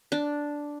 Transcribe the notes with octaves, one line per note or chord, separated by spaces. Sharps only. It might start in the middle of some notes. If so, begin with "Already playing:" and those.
D4